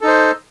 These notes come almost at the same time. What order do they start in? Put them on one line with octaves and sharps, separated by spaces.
A4 D#4 C5